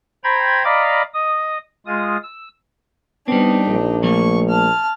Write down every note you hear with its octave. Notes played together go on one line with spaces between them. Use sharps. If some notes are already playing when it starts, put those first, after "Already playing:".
C5 G5 A#5 B5 G#6
D5 D#5 F5 A#5 B5 D6
D#5 D#6
G#3 F4 D#6
E6
G3 B3 C4 D4 D#4
A#1
F3 A3 A#3 C#6
A5 F6